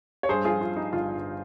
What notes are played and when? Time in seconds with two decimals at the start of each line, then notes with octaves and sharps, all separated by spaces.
0.23 C#5
0.29 G2 G#4 C5
0.45 F4 G#4
0.50 F3
0.61 F4
0.72 F3 D#4
0.93 G1 F4
1.14 G2